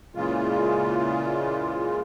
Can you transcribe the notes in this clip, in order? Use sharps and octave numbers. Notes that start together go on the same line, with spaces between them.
A#2 C#3 E3 G#3 F4